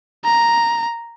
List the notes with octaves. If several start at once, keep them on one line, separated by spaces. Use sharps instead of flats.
A#5